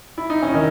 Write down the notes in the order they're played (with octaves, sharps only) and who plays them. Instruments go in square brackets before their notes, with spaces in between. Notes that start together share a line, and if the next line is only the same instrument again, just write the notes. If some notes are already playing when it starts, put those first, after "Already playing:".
[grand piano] E4
D#4
C#4
D#3 D#4